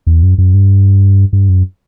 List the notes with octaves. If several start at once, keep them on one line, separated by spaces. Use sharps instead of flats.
E2
F#2
F#2
G2
G2
F#2